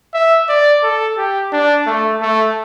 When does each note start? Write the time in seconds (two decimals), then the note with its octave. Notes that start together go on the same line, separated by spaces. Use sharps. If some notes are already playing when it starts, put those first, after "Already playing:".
0.14 E5
0.49 D5
0.83 A4
1.17 G4
1.53 D4
1.87 A3
2.21 A3